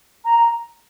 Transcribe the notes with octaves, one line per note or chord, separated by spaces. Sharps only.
A#5